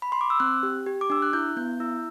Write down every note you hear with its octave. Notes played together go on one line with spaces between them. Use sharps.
B5
C6
D6
E6
C4 F#6
G4
G4
D6
D4 E6
F#6
E4 G6
B3 G6
E4 E6